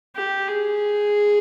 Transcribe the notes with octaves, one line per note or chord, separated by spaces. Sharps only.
G4
G#4